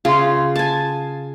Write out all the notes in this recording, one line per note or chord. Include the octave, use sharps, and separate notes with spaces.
C#3 F4
G#5 A5